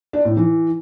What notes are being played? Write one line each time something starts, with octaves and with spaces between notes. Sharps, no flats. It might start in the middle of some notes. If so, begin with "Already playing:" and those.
D4
A2
E3